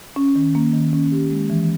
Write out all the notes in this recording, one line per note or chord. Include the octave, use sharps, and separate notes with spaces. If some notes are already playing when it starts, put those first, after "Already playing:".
C#4
D#3
A#3
D#3
C#4
G4
G#3
E3